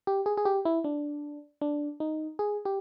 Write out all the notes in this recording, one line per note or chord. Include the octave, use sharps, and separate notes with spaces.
G4
G#4
G#4
G4
E4
D4
D4
D#4
G#4
G4